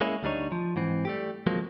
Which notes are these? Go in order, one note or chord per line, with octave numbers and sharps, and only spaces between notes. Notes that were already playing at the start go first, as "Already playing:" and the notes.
G#3 A#3 C#4 E4
D2 G3 D4 D#4 C#5
F3
G#2 E3 C4
G3 A3 G4
F3 F#3 G#3 A#3 C4